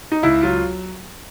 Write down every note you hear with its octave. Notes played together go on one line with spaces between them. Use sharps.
D#4
C#2 E4
F#3 F4